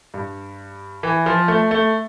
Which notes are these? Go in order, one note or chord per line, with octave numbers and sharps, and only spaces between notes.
G2
E3
F3
A3
A3